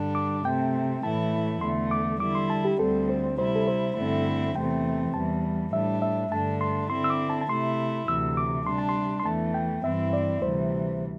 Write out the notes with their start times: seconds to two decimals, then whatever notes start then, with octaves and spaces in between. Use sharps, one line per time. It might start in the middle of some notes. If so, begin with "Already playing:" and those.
Already playing: G2 D3 G3 D4
0.15 D6
0.44 C3 A3 C4 G5
1.03 A2 E3 A3 E4 A5
1.61 E2 D3 A3 C6
1.91 D6
2.20 D3 G3 E4 D6
2.35 C6
2.50 A5
2.65 G4
2.79 D2 D3 G3 C4 A4
3.09 C5
3.38 C3 G3 E4 C5
3.56 A4
3.67 C5
3.97 G2 D3 A3 C4 E4
4.55 E2 C3 E3 A3 C4 G5
5.14 E2 E3 G3 A5
5.72 A2 G3 D4 E5
6.02 E5
6.31 G2 D3 A3 D4 A5
6.61 C6
6.90 D3 C4 E4 C6
7.04 E6
7.10 D6
7.30 A5
7.41 A5
7.49 C3 A3 E4 C6
8.08 D2 C3 E3 E6
8.37 D6
8.66 C3 G3 D4 C6
8.78 A5
8.89 C6
9.20 C6
9.25 E2 E3 A3 A5
9.54 G5
9.83 G2 E3 C4 E4 E5
10.13 D5
10.42 D2 C3 E3 G3 C5